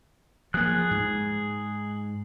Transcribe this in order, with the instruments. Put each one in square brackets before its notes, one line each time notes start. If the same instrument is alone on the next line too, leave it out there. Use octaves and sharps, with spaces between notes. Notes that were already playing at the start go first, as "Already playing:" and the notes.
[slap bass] F3 A#3 [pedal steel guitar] G#4 F#6
[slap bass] G#2